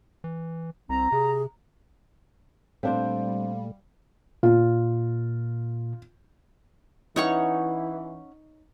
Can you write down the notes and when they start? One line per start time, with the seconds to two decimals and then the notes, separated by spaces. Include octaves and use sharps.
0.24 E3
0.89 C2 C4 A#5
1.12 C3 G#4
2.83 A#2 G3 A3 C4 D4 C5 F5
4.43 A#2 F4
7.16 E3 C#4 D#4 C#5 F#5 C#6